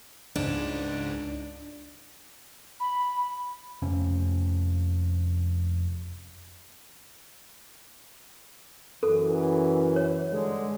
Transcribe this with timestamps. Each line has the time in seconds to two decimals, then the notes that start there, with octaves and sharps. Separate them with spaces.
0.36 C#2 G#2 D4
2.80 B5
3.82 F1 F2 C3 C#4
9.03 F#2 E3 A4
9.96 C#5
10.31 G2 D3 G#3